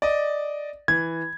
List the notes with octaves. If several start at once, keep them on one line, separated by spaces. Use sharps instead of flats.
D5 D#5
E3 G#6